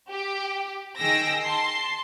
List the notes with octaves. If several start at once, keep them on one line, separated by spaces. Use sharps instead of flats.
G4
D#3 G#4 G5 E6 A#6
A5 C6 C7